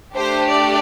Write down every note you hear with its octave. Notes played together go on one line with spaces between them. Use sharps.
A3 D4 G4 C5
D5